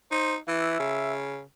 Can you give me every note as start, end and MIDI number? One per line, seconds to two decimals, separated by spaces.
0.11 0.37 63
0.11 0.35 72
0.48 0.79 52
0.48 1.14 76
0.80 1.42 49